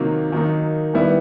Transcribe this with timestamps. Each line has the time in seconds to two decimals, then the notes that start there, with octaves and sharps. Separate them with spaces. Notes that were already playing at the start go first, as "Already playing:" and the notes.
Already playing: C3 D#3 F#3 A#3
0.32 D#3 F#3 A#3 D#4
0.94 D#3 G3 B3 E4